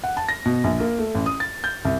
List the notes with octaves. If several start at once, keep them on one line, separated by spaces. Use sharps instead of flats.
F#5
A5
A#6
B2
A#1
A#3
A3
A1
D#6
A6
G6
C2